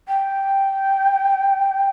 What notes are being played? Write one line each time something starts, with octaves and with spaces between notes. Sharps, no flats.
G5